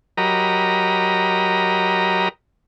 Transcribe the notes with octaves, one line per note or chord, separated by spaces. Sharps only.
F#3 G4 A#4 D#5 A#5 B5